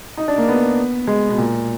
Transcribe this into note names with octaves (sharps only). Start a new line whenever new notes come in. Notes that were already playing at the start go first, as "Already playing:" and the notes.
D#4
D4
A#3
B3
G#3
B2
A#2